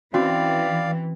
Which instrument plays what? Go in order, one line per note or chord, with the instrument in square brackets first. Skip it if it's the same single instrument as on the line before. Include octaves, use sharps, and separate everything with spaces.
[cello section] E3 [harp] C4 [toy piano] C#4 F#4 [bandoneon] D5 F5